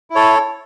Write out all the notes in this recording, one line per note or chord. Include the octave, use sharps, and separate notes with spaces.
E4
A4 C#5